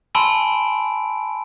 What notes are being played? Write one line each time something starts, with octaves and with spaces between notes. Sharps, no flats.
G#5 A5 B5 C6 E6 D7